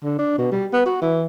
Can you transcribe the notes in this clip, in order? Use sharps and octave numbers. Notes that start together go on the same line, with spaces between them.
D3
D4
B2
G3
B3
F#4
E3